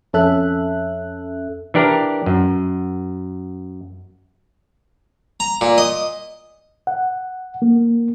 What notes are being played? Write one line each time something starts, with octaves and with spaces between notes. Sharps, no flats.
F2 C#4 A4 E5 F#6
E3 D4 G4 A#4
F#2
A#5
A#2
D#5
F#5
A#3